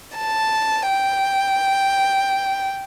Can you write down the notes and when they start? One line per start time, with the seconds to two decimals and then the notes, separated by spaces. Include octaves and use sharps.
0.18 A5
0.89 G5